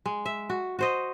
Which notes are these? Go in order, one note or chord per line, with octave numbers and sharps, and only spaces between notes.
G#3
E5
F#4
F#4 C5 D#5